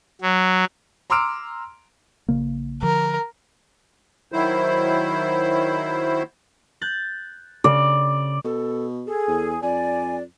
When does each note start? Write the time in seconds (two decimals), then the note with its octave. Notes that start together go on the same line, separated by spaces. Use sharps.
0.21 F#3
1.10 A#5 C6 D6 E6 F6 D7
2.29 A#1 C#3 A#3
2.83 D3 F3 A#4
4.32 D#3 F#3 E4 C5
6.81 F#6 G6 A6
7.64 C#3 D5
8.45 B2 A4
9.07 G#4 A4
9.28 E2
9.63 F2 D5 G#5